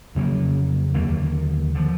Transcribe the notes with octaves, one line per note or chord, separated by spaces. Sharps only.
F2 C#3 F#3 A#3
D#2 D3 F#3 A#3
D3 F3